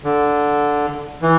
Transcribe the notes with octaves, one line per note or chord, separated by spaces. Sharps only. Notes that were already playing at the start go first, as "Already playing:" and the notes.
D3
E3